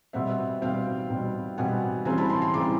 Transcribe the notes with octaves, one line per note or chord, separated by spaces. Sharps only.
B2 G3 C4 E5 F#5
B2 G3 C4 F5 G5
B2 G3 C4
B2 G3 C4 F#5 G#5
C#3 E3 G3 C4 G#5 A#5
A5 B5
A#5 C6
A#5 C6
C#3 E3 G3 C4 C6 D6